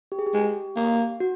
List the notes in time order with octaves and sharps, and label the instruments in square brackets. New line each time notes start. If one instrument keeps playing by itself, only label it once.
[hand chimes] G4
G#4
G4
[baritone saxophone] G#3
A#3
[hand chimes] F#4